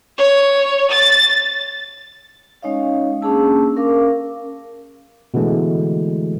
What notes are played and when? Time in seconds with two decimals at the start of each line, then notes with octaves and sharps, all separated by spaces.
0.17 C#5
0.90 A6
2.62 G#3 C#4 D#4 C#5 D#5 F5
3.22 A#3 C#4 D4 G#4 A5 E6
3.76 C#4 A#4 F5 D6
5.34 B2 D3 E3 G#3 A3